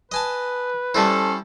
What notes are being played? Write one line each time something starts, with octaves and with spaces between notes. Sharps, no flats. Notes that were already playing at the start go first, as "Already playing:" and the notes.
B4 D#5 G#5 A5
G3 C#4 D4 E4 A4 C5